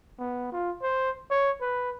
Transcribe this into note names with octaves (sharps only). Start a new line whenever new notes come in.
B3
F4
C5
C#5
B4